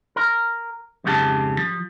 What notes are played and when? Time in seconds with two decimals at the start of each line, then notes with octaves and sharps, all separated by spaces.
0.16 A#4
1.04 F2 G#2 C#3 F#4 G4 A5
1.59 F3